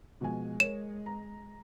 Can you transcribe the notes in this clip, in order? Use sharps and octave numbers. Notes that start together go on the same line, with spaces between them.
B2 F3 G#3 G#5
A#4 C#5 E7
A#5